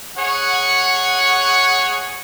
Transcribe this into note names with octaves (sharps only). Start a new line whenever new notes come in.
G#4 C#5 F#5